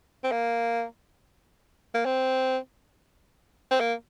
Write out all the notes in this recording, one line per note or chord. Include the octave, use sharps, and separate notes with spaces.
C4
A#3
A#3
C4
C4
A#3